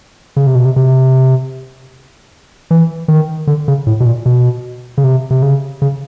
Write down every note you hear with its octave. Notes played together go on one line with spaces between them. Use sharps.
C#3
C3
B2
C3
C3
E3
D#3
D3
C#3
A2
B2
A#2
B2
C#3
C3
C3
C#3
C#3